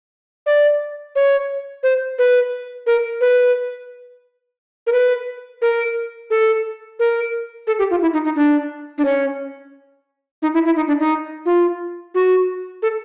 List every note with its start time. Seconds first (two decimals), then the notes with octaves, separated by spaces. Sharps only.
0.46 D5
1.16 C#5
1.83 C5
2.19 B4
2.86 A#4
3.21 B4
4.87 A#4
4.92 B4
5.62 A#4
6.30 A4
6.99 A#4
7.67 A4
7.79 G4
7.91 F4
8.02 E4
8.13 D#4
8.25 D#4
8.36 D4
8.98 D4
9.05 C#4
10.42 D#4
10.54 E4
10.65 E4
10.76 D#4
10.88 D4
11.00 D#4
11.46 F4
12.15 F#4
12.82 A4